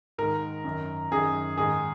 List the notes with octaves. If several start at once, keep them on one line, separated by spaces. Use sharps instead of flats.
G#2 D#3 A#4
F#2 D#3
F#2 D#3 G#4
G#2 D#3 G#4